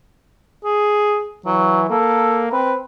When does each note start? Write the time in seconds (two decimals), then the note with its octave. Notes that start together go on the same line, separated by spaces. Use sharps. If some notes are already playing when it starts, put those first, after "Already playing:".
0.64 G#4
1.46 E3 F#3
1.90 A#3 A4
2.52 C4 B4